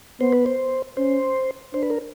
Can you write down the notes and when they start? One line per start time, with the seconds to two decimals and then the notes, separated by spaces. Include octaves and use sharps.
0.21 B3 C5
0.33 B4
0.46 C5
0.97 C#4 C5
1.74 D4 C5
1.83 B4
1.90 A#4